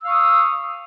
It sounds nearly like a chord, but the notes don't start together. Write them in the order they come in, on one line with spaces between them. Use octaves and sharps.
E6 F5 C#6 D#6